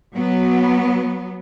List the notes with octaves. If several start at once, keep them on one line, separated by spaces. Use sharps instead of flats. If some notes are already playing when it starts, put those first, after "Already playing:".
F#3 B3